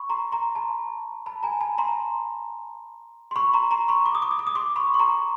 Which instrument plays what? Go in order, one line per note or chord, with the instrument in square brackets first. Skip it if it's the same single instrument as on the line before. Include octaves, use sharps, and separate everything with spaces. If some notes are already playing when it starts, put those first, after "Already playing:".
Already playing: [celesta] B5 C#6
A#5 C6
A#5 C6
A5 B5
A5 B5
G#5 A#5
A5 B5
A#5 C6
C6
B5 C#6
A#5 C6
A#5 C6
B5 C#6
D6
D#6
D6
D#6
D6
D#6
C6 D6
B5 C#6
C#6
A#5 C6